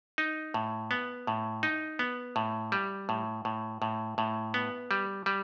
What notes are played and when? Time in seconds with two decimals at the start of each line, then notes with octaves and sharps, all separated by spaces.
0.18 D#4
0.54 A2
0.91 B3
1.27 A2
1.63 D#4
1.99 B3
2.36 A2
2.72 G3
3.09 A2
3.45 A2
3.82 A2
4.18 A2
4.54 B3
4.91 G3
5.26 G3